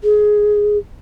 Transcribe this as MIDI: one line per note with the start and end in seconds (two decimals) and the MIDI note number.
0.03 0.78 68